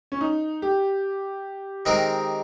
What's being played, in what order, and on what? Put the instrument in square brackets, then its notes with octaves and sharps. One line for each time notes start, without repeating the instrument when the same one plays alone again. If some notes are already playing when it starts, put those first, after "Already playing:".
[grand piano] C#4
D#4
G4
[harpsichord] D#3 G#3 C4 D#4 A#4